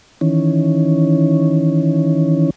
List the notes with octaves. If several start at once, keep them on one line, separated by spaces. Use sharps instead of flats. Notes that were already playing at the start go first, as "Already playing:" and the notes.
D#3 E3 C#4